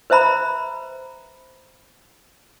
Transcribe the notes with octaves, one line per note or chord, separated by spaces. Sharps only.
B4 C5 E5 A#5 B5